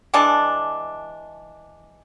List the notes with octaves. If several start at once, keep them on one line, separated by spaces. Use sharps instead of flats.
E3 G#3 D4 A5